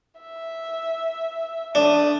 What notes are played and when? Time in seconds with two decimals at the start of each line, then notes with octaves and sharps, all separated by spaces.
0.20 E5
1.75 A3 D4 D#6